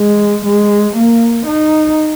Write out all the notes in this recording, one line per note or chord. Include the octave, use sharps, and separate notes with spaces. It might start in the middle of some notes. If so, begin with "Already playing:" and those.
Already playing: G#3
G#3
A#3
D#4